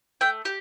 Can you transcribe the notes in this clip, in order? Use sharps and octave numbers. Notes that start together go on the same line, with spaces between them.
A3 G5
G4